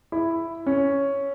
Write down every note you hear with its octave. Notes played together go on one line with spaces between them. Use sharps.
E4
C#4